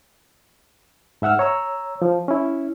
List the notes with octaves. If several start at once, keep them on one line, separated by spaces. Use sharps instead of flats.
G#2 E5 F#5 E6 F6
C#5 A#5 E6
F3
C#4 E4